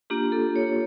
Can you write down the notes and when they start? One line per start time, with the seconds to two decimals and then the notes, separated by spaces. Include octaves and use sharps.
0.10 A#3 D4 F4 G4
0.32 A4
0.56 C#5